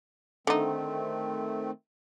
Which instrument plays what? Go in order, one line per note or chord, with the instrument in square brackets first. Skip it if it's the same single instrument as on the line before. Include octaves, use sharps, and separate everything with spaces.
[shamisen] D3 D#4 [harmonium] D#3 A3 C4